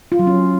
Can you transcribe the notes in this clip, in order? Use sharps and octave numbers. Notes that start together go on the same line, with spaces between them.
F4
F#3
C#4